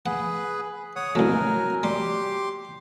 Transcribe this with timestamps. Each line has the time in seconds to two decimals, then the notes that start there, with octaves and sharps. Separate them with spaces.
0.06 G#4 B4 F#5
0.96 C#5 F#5 D#6
1.15 C2 F#3 A3 A#4 G#5
1.83 G3 G4 C6 D6